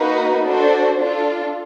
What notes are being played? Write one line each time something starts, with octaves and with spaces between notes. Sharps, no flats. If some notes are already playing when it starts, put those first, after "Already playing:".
Already playing: A#3 D#4 F#4 B4
D4 F#4 A4 C5
D4 F4 A4